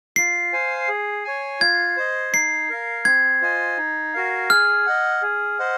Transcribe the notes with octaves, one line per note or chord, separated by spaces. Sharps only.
F4 C7
C5 F5 G#5
G#4
C#5 G#5
F4 G#6
C5 D#5
D#4 C7
A#4 F5
C4 G#6
F4 C5 D#5 G#5
D#4
F#4 A#4 F5
G#4 F6
D#5 F#5
G#4
C5 D#5 F#5